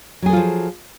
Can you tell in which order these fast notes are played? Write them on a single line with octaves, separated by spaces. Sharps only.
F#3 G#4 A4 F4 F3